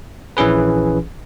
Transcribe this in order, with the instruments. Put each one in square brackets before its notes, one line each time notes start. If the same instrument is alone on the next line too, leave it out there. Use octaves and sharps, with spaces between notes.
[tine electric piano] A#1 E3 C#4 G#4 B4